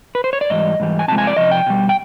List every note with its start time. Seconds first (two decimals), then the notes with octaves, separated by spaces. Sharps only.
0.15 B4
0.24 C5
0.33 C#5
0.41 D5
0.50 G#2 E3 G3 D#5
0.80 G#2 E3 G3
0.99 G#5
1.08 C3 F3 G#3 A5
1.18 G#5
1.27 D5
1.37 C3 F3 D#5
1.51 G5
1.66 B2 G3
1.89 G5